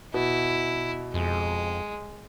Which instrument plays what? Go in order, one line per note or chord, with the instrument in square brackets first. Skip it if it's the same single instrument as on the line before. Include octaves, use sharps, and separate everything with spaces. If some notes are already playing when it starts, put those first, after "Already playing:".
[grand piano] B2 [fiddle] E4
[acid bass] F2 [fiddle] G#3